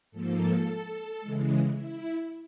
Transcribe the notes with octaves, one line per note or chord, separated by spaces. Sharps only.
G#2 F3 A#3 A4
C#3 E3 G#3
E4